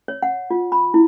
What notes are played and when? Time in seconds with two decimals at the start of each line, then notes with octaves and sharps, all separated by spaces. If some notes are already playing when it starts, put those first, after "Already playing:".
0.08 C#5
0.22 F#5
0.51 F4
0.72 B5
0.94 E4